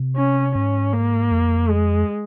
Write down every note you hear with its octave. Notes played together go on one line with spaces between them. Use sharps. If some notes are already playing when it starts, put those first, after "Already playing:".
Already playing: C3
C#4
G#2 C#4
A#3
F2
G#3